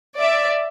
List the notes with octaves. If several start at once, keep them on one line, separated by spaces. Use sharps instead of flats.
D5 E5